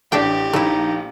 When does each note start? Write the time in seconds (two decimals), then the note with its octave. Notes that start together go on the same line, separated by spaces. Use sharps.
0.12 A1 A3 D4 G4 G5
0.53 A#1 A3 D#4 E4